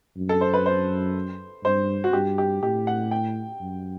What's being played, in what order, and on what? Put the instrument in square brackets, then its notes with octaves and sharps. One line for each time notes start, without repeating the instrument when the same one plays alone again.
[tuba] F#2
[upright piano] A4
C5
B4
C5
[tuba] G2 [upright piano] C5
[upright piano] F#4
[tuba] G2 [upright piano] G4
[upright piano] G4
[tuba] A2 [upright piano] G4
[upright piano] F#5
G5
[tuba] F#2